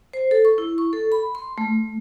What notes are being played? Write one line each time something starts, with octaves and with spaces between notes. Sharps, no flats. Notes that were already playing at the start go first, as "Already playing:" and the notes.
C5
A4
C#6
E4
C#6
A4
B5
C6
A3